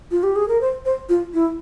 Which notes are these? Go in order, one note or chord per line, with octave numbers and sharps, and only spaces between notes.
F4
G4
G#4
A#4
C5
C5
F4
E4